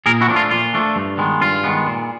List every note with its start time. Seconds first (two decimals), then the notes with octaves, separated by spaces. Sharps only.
0.06 A#2 G#4 A#4
0.21 E4 F#4
0.28 F3 A3 D4
0.36 F4
0.51 A#2 F4
0.74 F3 A3 D4
0.96 G2
1.18 D#3 G#3 B3
1.41 G2 F4
1.64 D#3 G#3 B3
1.87 A#2